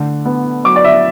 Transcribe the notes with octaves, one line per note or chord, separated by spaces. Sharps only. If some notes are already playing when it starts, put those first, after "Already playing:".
Already playing: D3 A3
B3
F#3 D6
D5
E5